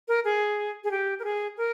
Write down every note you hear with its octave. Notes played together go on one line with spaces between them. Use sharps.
A#4
G#4
G#4
G4
A#4
G#4
A#4